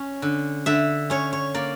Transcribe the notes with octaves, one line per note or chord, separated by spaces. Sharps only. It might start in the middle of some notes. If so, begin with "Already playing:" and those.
Already playing: C#4
D3
D3 E5
C#4 C#5
C#5
A#3 D5